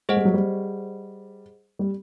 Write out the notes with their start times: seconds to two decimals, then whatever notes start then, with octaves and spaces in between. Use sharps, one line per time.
0.09 G#3 G#4 C5 D#5 F#5
0.17 G3
0.25 F#3
0.34 G3
1.79 G3